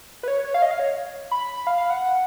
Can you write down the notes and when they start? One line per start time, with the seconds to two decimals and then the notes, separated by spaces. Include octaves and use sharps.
0.23 B4
0.28 C#5
0.44 C#5
0.54 F5
0.62 D#5
0.71 F5
0.80 C#5
1.31 B5
1.67 F5
1.78 F5
1.90 F#5